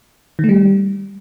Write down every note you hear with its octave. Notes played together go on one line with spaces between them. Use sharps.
D#3
A3
G3